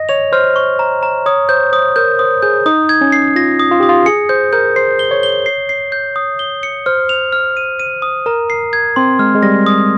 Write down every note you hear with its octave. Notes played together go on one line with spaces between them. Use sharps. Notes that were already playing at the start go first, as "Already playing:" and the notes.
Already playing: D#5 A#6
C#5 F7
C5 F6
C#6
A#5
A#5
C#5 D#6
C5 G6
C5 D#6
A#4 G6
C5 D#6
G#4 G6
D#4 D#6
G#6
C#4
C7
F4 A#6
D#6
F4
G4 D#6
F4
G#4 C#7
C5 G6
A#4 G6
C5 C7
G7
C#5
G7
C7
C7
G6
D#6
G7
C#7
C5 F6
F7
F6
D#7
D#7
D#6
A#4 A#5
C7
G#6
C4 C6
G#3 F6
G#3
G3 A#6
D#6